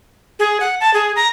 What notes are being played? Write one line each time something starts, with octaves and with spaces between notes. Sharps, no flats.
G#4
F#5
A5
G#4
A#5